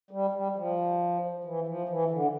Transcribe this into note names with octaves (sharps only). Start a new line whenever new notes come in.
G3
G3
F3
E3
F3
E3
D3